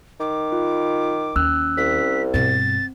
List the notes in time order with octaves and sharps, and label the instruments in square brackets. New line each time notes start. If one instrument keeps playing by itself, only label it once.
[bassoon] D#3 [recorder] D6
[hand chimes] F4
[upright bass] D#2 [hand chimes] C#4 E6 F#6
[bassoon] C2 [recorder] B6
[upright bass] G2 B2 [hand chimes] C4 [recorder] A6